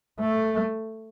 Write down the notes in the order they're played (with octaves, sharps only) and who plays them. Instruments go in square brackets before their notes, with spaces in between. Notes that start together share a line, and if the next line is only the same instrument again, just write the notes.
[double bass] A3